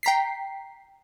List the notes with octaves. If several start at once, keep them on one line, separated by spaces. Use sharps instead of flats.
G5 A#5 B6 C7